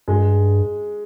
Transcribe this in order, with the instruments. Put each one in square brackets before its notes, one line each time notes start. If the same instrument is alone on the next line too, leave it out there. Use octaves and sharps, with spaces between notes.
[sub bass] G2 [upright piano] G#3